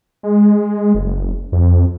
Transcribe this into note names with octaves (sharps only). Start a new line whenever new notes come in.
G#3
F#1
F2